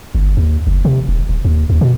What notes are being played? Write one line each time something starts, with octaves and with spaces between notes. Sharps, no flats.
G1
D#2
F#1
C3
D#1
D1
D#2
D#2
B2